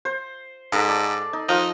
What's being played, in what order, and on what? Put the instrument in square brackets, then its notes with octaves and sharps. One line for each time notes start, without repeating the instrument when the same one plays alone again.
[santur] C5
[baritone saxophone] G#2 [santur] A4
[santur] D5 A5
D#4
[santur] F3 [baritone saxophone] D#4